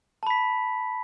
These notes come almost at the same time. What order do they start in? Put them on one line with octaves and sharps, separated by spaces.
A5 B5 B6